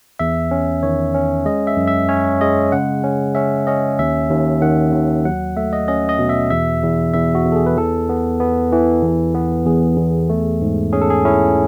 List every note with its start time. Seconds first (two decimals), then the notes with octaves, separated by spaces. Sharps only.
0.19 E2 E5
0.51 C#4
0.83 D#3 C#5
1.14 C#4
1.45 G#3 D#5
1.67 E5
1.77 F#2
1.87 E5
2.09 C#4 C#5
2.41 G#3 D#5
2.72 C#3 F#5
3.04 C#4
3.35 C#4 E5
3.67 C#4 D#5
3.99 D#2 E5
4.30 D#2
4.62 D#3 F#5
4.93 D#2
5.25 F#3 F#5
5.57 A3 E5
5.73 D#5
5.88 C#4 D#5
6.09 D#5
6.19 B2
6.29 E5
6.50 E2 E5
6.83 E2
7.14 E2 E5
7.35 F#4
7.46 E2
7.52 A4
7.56 G#4
7.66 B4
7.77 E3 A4
8.09 B3
8.40 B3
8.73 E3
9.03 E2
9.34 B3
9.66 E2 G#4
9.98 E2
10.29 A3
10.62 G#2
10.93 C#4 G#4
11.02 A4
11.10 G#4
11.25 C#4 E4